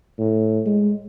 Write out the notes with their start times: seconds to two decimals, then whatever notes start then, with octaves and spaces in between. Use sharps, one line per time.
0.19 A2
0.66 G#3